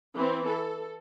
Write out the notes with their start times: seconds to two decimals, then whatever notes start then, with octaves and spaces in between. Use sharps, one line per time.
0.15 E3 C4
0.46 A4